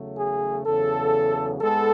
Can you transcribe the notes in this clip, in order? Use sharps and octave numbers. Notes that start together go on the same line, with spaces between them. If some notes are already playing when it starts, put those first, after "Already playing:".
Already playing: E2 C#3 F#3 A3
G#4
E2 C#3 F#3 A4
G#2 G#3 B3 A4